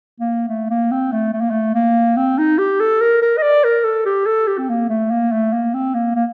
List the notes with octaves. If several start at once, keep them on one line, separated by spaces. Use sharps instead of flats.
A#3
A3
A#3
C4
A3
A3
A#3
A3
A#3
C4
D#4
G4
A4
A#4
A#4
D#5
D5
A#4
A4
G4
A4
G4
C4
A#3
A3
A#3
A3
A#3
C4
A#3
A#3